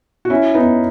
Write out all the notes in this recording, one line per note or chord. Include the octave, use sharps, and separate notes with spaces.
F#4
C#4 E4
B3 D#4